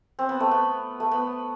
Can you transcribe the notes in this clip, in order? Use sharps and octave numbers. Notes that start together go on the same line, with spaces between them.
C4
B3
A3
B3
A3
B3